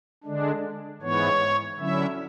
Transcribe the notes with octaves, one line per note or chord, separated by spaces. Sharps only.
D3 G#3 D4
G#2 E3 B3 C#5
D3 F#3 C#4 E4 E5